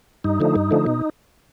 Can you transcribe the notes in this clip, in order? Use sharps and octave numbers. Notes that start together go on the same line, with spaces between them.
G2 D#4
D3 F3 A3
G2
D3 F3 A3
B2